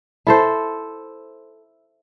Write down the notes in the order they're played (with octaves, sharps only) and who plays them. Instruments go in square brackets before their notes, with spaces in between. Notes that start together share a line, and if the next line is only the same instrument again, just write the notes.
[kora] E4 A4 C5